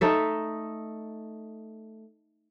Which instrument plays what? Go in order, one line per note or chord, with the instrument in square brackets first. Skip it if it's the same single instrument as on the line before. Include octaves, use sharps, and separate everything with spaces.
[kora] A3 D#4 A4 E5